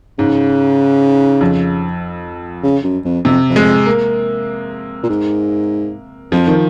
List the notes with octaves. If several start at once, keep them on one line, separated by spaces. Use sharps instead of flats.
G#2 C#3
F2
C#3
F#2
F2
F2 C3
F2
G#3
A#3
A#2
G#2
F2 F3
D#3